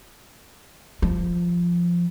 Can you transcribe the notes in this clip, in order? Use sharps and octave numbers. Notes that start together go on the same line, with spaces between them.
F3